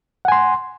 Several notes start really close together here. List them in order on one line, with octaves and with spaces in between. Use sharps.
F#5 G#5 C6